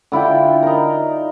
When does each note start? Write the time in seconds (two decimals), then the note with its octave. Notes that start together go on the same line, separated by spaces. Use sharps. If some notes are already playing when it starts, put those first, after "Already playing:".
0.12 D3 E4 F4 G5
0.63 D#4 A#4